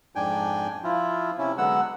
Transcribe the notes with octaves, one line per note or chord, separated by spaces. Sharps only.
F2 G#2 D4 G5 G#5
F3 E4 F4
C3 C#4 E4
D3 F#3 G#3 B3 F#5 E6